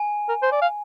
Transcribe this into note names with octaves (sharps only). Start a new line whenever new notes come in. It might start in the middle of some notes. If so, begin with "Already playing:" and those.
Already playing: G#5
A#4
C5
D5
F5